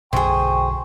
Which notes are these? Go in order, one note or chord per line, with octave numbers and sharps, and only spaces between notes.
B1 F#2 D3 G#4 C5 G5 C#6